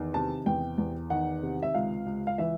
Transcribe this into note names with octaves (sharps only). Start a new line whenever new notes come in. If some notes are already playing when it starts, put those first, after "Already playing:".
Already playing: E2 D#3
C3 A5
E2 G5
E2
D#3 F#5
C3
E5
C#2 F5
C#2
F5
E3 E5